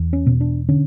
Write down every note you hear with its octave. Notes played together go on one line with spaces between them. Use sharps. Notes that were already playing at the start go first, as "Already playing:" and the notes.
Already playing: E2
C#4
B2
D4
D3 C#4